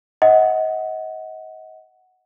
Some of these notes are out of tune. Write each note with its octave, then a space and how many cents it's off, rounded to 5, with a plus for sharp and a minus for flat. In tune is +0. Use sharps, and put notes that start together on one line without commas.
D#5 +30 F#5 +0